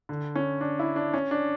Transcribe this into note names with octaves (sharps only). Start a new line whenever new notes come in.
D3
C#4
D4
E4
D4
C#4
D4